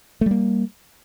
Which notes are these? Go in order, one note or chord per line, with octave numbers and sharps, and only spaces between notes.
G3 A3 A#3